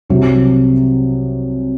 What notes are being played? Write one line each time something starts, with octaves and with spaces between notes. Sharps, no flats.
C2 C3 F#3